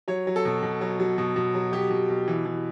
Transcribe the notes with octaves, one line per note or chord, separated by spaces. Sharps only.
F#3 C#5
F#3
A4
B2
B2
F#3
F#3
B2
B2
F#3
F#3 G4
B2
B2
E3
E3